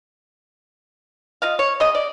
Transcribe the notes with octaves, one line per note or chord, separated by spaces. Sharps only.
F4 D#5 F5
C#5
C#3 D#5
D5